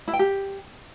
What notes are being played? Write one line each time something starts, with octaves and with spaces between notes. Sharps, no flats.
E4
G5
G4